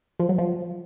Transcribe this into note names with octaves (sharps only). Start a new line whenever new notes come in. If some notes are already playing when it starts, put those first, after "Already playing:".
F3
F#3
F3